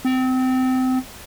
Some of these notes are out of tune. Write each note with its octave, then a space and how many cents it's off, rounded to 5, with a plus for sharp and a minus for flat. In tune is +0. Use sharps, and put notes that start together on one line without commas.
C4 -25